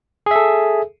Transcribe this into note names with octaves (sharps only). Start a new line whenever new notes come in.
G#4 A4 E5